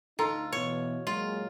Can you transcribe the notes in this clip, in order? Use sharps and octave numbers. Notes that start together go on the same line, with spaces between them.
D2 D#4 F4 A4 A#5
B2 E3 C#5
A#2 F#3 G#3 F4